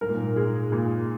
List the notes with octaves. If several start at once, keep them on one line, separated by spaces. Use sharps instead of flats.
G#2 A#4
A#2
G#2
G#3
A#2